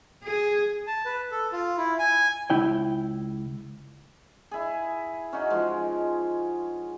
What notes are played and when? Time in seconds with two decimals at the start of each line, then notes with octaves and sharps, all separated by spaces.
0.24 G#4
0.87 A5
1.05 B4
1.31 A4
1.52 F4
1.77 E4
1.99 G#5
2.50 C#2 E4 G5
4.51 E4 G#4
5.33 C#4 D#4 F#4
5.50 F3 G#3